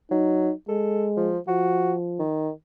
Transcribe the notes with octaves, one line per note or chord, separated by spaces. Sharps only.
F#3 D#4
G#3 A4
F3
F3 F#4
D#3